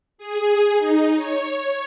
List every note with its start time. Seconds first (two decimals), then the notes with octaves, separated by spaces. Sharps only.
0.18 G#4
0.79 D#4
1.16 C#5